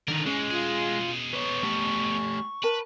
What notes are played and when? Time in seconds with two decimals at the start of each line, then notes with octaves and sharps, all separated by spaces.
0.08 D3 D#3 A#4 B4
0.26 A#2 E3 G#3 C#4
0.51 B2 F4 G#4
1.34 B4 C#5 C#6
1.63 A3 G4
2.63 A#4 B4 A5